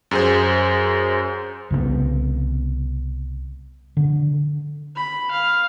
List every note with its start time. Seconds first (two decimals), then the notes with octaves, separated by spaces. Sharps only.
0.11 F#2 G#4 C5
1.71 C2 C#3 E3 B3
3.97 D3
4.96 B5
5.31 F5